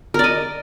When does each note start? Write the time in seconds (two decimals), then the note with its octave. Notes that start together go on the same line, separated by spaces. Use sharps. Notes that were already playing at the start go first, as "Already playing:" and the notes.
0.14 A#4
0.19 D5
0.24 D#5